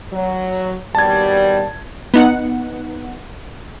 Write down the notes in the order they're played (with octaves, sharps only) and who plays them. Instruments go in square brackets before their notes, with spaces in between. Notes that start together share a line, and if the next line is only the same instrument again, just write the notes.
[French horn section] F#3
[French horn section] D#2 B2 G3 [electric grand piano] A5 G#6
[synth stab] B3 D#4 F#5